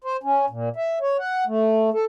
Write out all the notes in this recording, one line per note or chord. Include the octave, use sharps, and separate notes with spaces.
C5
C#4
A#2
E5
C#5
F#5
A3
A4